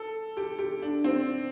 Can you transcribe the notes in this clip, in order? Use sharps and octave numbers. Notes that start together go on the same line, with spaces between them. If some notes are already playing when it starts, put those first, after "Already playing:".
Already playing: A4
G4
G4
D4
C4